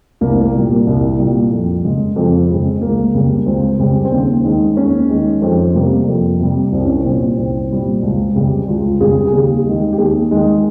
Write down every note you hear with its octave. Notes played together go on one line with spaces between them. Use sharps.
C2 A#3
C4
A#3
A#2 G3
C2
A#2 G3
F2
C#3 G#3
F2 C4
C#3 G#3
C#2 A#3
C#3 G3
C#2 C4
C#3 G3
C4
D#2 C#4
D#3 G#3
D#2 C#4
D#3 G#3
F2 C4
C3 G3 A#3
F2
C3 G3
C2 C4
C#4
C4
A#2 G3
C2 C4
A#2 G3
C#2
C#3 G3
C#2 F4
C#3 G3 G#4
G#4
D#2 G4
D#3 G#3
G4
D#2 G#4
D#3 G#3